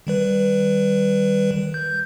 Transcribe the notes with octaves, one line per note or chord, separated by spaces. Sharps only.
D#3 G3 B4
G6